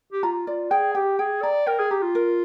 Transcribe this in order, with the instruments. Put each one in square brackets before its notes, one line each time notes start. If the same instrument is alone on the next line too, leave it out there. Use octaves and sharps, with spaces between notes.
[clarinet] G4
[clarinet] F4 [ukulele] A#5
[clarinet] F4 [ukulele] D5
[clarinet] G#4 [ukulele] G5
[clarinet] G4 [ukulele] G5
[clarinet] G#4 [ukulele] G5
[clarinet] D5 [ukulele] A#5
[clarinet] A#4 [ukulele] G5
[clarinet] G#4
[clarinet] G4 [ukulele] A#5
[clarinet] F4
[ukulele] A#4